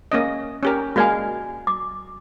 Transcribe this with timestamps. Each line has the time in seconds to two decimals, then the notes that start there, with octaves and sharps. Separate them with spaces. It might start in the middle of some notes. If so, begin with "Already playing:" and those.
0.12 A#3 C#4 D#5
0.63 C#4 G4 A#4
0.96 G#3 A#3 F#4 D5 F5 G#5
1.67 D6